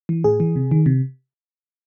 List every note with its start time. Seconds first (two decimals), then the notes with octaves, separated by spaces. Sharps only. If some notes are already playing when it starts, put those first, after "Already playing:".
0.09 E3
0.24 A2 G#4
0.40 E3
0.56 C3
0.71 D#3
0.86 C3